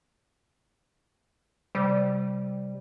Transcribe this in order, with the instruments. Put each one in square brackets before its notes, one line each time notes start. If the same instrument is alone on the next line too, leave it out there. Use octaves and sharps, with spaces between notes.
[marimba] C3 [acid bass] G3